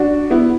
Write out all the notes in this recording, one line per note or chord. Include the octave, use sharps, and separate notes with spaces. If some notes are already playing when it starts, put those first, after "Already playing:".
Already playing: D4 F#4
B3 E4